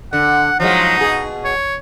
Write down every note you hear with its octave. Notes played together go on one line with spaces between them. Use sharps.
D3 F#5
F3 F#3 G#3 D#4
B2 G#4
C#5